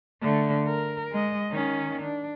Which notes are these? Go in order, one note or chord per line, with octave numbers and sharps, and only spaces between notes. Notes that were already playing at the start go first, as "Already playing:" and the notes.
D3 A3
A#4
G#3 D#5
D#3 C#4
D4